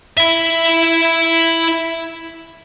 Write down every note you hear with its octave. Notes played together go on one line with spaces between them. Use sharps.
E4 E5